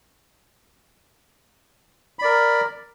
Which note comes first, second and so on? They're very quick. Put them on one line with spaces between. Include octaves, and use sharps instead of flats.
B5 D5 A#4